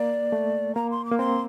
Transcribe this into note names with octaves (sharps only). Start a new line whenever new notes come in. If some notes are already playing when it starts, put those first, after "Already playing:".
Already playing: A#3 D5
A3
A#3 A#5
C6
D6
A#3
C4 C6